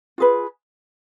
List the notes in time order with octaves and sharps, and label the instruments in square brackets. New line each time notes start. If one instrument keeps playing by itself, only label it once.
[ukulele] F4 G#4 B4